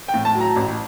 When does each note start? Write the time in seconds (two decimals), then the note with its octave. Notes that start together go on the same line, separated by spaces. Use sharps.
0.08 G5
0.14 A2
0.25 A5
0.35 F#3
0.40 A#5
0.56 A1